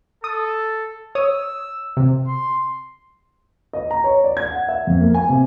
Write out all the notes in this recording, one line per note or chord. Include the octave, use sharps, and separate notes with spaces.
A4 D#6
C#5 D#6 E6
C3
C6
D#5
A#5
C#5
D5
G#6
F#5
E5
F2
A#3
G#5
C3